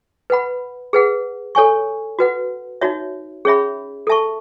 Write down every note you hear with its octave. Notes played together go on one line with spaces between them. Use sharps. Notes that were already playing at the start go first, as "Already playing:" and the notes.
B4 F#5 B5
G#4 B4 F#5
A4 C#5 G#5 C#6
F#4 B4 F#5
D#4 F#4 C#5 E5
C#4 G#4 C#5 E5 B5
A4 E5 A5 C#6